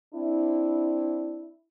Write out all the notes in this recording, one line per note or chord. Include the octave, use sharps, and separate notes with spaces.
C4 D4 E4